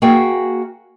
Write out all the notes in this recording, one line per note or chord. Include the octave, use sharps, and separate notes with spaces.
A#3 F#4 G#4 E5 G5 G#5